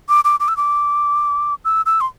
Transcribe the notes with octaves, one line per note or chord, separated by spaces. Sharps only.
D6
D6
D6
E6
D6
E6
E6
C6